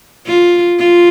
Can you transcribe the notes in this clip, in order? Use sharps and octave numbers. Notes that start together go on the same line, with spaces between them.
F4
F4